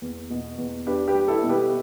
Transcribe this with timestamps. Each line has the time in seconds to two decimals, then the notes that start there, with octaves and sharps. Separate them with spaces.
0.02 E2
0.30 B2
0.58 E2
0.87 D4 G4 B4
1.08 G4 B4
1.15 G3
1.28 E4 A4
1.43 B2
1.49 G4 B4